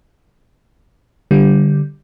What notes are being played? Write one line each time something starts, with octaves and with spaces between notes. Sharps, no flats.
D3 G3